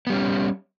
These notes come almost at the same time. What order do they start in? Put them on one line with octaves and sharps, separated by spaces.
B3 G3 C#4